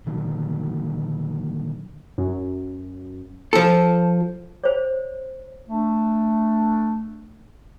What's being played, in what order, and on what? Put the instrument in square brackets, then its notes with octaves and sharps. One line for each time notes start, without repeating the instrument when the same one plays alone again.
[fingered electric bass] A#2 D3 D#3 F#3
[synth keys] F#2
[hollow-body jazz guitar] F3 A4
[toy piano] C5 C#5
[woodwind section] A3 D4